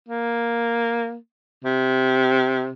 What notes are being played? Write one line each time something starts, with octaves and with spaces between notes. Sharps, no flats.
A#3
C3